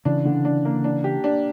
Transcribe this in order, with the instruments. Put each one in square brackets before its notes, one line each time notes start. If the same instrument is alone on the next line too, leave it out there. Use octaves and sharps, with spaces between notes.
[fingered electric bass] C#3 E3 [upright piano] D4
[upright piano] D3
D4
A#3
D4
G4
D4